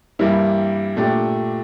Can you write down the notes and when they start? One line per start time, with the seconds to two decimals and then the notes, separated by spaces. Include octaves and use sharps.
0.19 G2 E3 G3 A#3 E4
0.96 A#2 A3 D4 G4